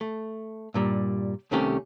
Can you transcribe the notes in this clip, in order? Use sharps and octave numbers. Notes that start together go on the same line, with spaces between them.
A3
G2 A#2 G3
C2 C3 D#3 A3 C#4 G4